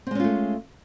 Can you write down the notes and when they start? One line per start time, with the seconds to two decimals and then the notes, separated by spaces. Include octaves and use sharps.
0.07 C4
0.11 G#3
0.15 C#4
0.20 F4
0.24 A3